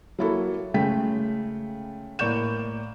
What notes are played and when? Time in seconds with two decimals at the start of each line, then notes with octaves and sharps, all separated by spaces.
0.19 F#3 A#3 E4 F#4 A4
0.74 C#3 G#3 A3 G5 B6
2.19 A2 A#3 D5 C#6 G6 E7